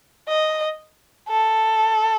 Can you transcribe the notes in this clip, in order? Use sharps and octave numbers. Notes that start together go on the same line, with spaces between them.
D#5
A4